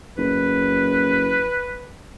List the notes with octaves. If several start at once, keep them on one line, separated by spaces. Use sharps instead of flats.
F#1 B4